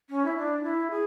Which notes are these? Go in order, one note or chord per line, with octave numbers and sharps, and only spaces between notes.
C#4
E4
D4
E4
G#4